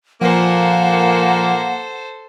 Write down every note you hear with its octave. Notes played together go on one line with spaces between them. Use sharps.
A#2 F3 A#3 A4 C5 F#5